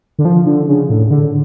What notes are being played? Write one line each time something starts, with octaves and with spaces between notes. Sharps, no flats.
D3
F3
D3
C#3
A2
D3